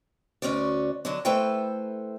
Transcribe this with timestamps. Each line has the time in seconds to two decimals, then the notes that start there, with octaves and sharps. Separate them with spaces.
0.42 D2 C#4 F#4 D5
1.05 D3 F#3 D4
1.25 A3 E4 A4 B4 C5 G5